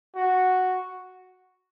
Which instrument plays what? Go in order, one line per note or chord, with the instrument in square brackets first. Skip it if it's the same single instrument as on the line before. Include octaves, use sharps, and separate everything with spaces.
[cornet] F#4